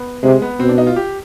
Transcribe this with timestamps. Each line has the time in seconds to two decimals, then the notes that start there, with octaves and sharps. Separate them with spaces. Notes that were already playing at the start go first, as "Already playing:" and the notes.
Already playing: B3
0.23 C3 G#3
0.42 B3
0.60 B2 C4
0.69 D4
0.78 D#4
0.87 F4
0.96 G4